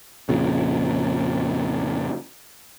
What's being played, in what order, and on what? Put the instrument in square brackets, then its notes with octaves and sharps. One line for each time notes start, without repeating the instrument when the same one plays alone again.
[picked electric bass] F2 A#2 C#3